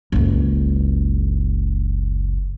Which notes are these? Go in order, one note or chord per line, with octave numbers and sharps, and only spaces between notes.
F#1 C#2